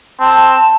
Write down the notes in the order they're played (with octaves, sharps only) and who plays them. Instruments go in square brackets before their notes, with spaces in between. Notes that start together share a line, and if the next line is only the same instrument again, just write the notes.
[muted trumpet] C4 [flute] A5